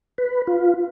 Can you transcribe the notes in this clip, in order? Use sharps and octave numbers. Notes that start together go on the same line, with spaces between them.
B4
F4